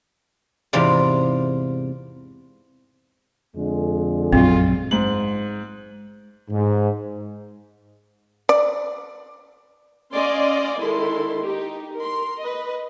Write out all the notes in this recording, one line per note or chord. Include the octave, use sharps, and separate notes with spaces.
E2 G#2 C3 F4 D5
F2 D3 G#3
A#1 F#2 F#3 C4 F4
G#2 F#7
G#2
D5
C#4 D5 D#5 F5 G#5 C6
D#3 G#3 E4 A4 C6
D#4 G4
A#4 C6
B4 D#5